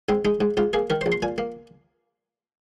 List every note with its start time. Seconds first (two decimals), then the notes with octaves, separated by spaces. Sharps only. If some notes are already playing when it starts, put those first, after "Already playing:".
0.09 G#2 C4
0.25 G#3 D#4
0.41 G#2
0.57 G#2 F4
0.73 A#3 G#4
0.90 D#3 A#4
1.01 C5
1.06 A#1
1.12 C6
1.22 A#2 G#5
1.38 A#3